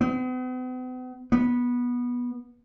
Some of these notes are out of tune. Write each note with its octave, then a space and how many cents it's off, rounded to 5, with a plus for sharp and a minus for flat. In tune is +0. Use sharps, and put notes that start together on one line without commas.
B3 +45
B3 -15